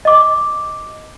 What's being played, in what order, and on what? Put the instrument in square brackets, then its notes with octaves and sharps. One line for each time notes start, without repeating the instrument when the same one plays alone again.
[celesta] D#5 D6